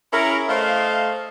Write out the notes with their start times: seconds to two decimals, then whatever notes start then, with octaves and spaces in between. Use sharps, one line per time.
0.13 C#4 E4 G#4 A#4
0.49 A3 C5 D#5 F5